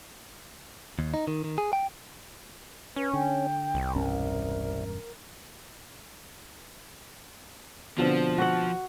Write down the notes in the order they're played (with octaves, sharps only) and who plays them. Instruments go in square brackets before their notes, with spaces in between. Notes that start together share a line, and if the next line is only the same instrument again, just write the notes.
[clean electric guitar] D#2
D#4
D#3
D#3
G#4
G5
[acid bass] C#4 [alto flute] B4
[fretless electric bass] D3 [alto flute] G5
[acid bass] C2
[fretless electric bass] E1 G2 C#4 [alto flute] A#4
[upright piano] B2 D3 C4 [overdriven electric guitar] F3
[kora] F#4 F#5